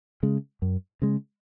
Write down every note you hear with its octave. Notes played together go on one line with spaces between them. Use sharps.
C#3 G#3
F#2
C#3 G#3